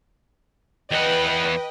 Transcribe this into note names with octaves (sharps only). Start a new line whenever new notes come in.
E2 B4 D#5 F#5 G5